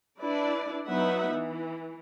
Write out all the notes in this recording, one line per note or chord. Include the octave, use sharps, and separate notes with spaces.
D4 E4 B4 D5
F#3 B3 D#4 B4 E5 F#5
E3